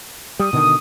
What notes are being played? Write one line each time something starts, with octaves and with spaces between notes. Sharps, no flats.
G3 D#6
B2 D3 D#3